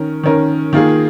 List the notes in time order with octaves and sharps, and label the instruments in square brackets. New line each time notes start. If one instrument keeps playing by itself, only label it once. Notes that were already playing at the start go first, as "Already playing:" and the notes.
Already playing: [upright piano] D#3 C#4 A#4
D#3 C#4 A#4
D#3 A#3 F4 G#4